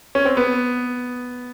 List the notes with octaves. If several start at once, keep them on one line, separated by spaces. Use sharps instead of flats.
C#4
C4
B3